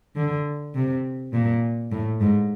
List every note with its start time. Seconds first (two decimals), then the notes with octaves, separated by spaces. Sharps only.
0.16 D3
0.74 C3
1.33 A#2
1.91 A2
2.21 G#2